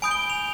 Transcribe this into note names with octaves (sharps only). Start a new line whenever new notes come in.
G#5 B5 D#6 G6 D7
G7
F7